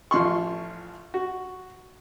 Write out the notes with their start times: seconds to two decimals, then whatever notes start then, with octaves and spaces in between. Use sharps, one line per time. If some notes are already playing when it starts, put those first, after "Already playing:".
0.11 A1 F3 C6 C#6
1.14 F#4